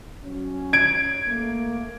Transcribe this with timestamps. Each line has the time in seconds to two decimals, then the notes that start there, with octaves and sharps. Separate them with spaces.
0.24 F#3 C#4
0.73 G#6 D7
1.27 A3 A#3